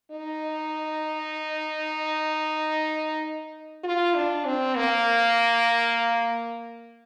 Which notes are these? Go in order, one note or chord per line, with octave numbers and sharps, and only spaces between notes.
D#4
F4
D4
C4
A#3